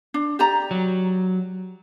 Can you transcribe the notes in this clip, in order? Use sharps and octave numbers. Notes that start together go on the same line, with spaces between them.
D4
G4 D5 A#5
F#3